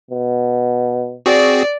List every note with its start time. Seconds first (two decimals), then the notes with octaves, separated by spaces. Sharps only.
0.11 B2
1.26 C4 F#4 G#4 D5